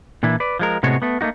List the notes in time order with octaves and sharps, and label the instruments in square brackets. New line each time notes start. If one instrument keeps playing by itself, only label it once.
[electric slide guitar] A#2 E3 D4 E4
B4 D5
F3 G#3 A#4
A2 C3 G#3 B3 F#4 C#5
A3 B3
A3 A#3 D#4 F#4